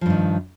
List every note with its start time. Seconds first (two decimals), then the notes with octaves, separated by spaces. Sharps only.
0.01 F3
0.06 G2
0.10 D#3